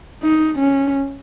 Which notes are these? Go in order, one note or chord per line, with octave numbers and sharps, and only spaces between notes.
D#4
C#4